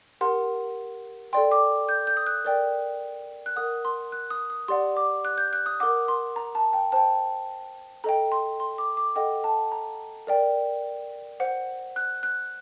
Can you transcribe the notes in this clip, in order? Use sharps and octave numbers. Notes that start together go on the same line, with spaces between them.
G4 A#4 F#5 C6
A4 D5 G5 C6
D6
G6
G6
D#6
F#6
A#4 D5 G5
F#6
A#4 F#5 D#6
C6
F#6
D#6
D#6
G4 D5 F#5 C6
D6
F#6
G6
F#6
D#6
A#4 F#5 D6
C6
A#5
A5
G5
C5 G5 A5
A4 D#5 G5 A#5
C6
C6
D6
D6
A4 D#5 F#5 G5
A5
A#5
A#4 D5 G5
C5 F#5
F#6
F#6